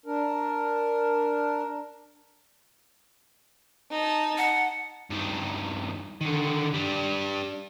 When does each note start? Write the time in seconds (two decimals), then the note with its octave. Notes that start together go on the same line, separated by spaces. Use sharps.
0.06 D4 A#4
3.91 D#4 A5
4.38 F#5
5.11 G2 D#3
6.21 D3 D#3
6.74 G3 D4